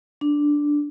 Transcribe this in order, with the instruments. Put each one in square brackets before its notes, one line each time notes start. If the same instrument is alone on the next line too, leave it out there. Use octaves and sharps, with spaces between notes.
[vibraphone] D4